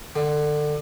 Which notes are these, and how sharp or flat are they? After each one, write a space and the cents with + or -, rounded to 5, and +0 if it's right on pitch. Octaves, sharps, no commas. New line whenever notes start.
D3 +25